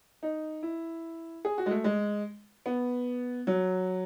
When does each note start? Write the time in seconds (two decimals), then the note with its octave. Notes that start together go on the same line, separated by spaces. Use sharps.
0.23 D#4
0.63 E4
1.45 G#4
1.58 F#4
1.66 G#3
1.71 A3
1.84 G#3
2.66 B3
3.47 F#3